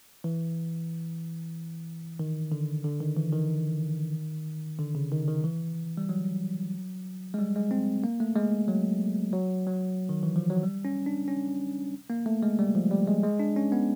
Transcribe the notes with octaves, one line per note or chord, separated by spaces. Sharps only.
E3
D#3
D3
D3
D#3
E3
D#3
D3
C#3
D#3
D#3
E3
G3
F#3
G#3
G3
G#3
C4
A#3
A3
G#3
F#3
F#3
F#3
D#3
E3
F3
F#3
G3
C#4
D4
C#4
A#3
A3
G#3
G3
F3
G3
G#3
G#3
D4
C#4
B3